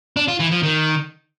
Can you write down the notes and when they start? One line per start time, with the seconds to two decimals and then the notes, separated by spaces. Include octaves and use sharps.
0.17 D4
0.28 F4
0.40 E3
0.51 F3
0.63 D#3